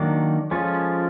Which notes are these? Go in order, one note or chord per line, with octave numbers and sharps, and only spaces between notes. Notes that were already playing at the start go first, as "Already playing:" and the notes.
Already playing: D#3 F#3 A#3 D4
F3 G#3 C#4 F4 A4